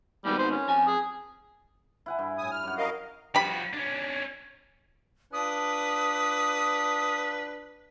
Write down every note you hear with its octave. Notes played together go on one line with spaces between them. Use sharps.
G#2 D#3 G3 B3
C5
C#4
F2 G#5
G#4
E4 F#5 G#5
G2
A2 G#5 D#6
F6
F#2 F#5
A#4 D#5 F5
F3 F#4 G4 B5
C#4 D4
D4 F4 B4 A5 D#6